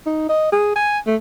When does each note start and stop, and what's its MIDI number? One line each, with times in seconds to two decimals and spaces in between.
0.06 0.26 63
0.29 0.48 75
0.52 0.76 68
0.76 0.99 80
1.06 1.16 57